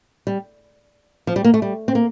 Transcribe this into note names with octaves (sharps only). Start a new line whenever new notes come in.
G3
F3
G3
A#3
A3
G3
C4
A#3